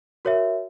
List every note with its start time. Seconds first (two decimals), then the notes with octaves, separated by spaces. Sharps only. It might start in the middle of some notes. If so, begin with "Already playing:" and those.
0.25 F#4 A#4 C#5 E5